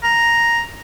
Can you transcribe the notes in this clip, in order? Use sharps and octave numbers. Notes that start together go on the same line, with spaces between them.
A#5